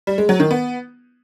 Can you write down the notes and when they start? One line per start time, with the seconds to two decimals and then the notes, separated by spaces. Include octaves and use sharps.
0.07 G3
0.18 G#3
0.29 F#3
0.40 D#3
0.51 B3